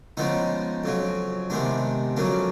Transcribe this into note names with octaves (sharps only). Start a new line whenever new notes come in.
C#3 F3 G#3 B3 D#4
F2 C#3 F#3
C3 D#3 G#3 B3 D4
F2 C#3 F#3 A#3 D4